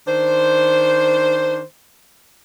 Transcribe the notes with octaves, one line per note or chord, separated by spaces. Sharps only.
D#3 D4 C5